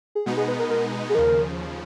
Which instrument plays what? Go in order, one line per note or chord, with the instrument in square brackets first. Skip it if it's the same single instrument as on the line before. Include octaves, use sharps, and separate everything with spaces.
[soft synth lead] G#4
[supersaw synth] B2 G#3 B3 D#4 [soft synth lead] F#4
[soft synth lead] G#4
B4
A#4
A#4
G#4
[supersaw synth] D#2 C#3 F3 [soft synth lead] A#4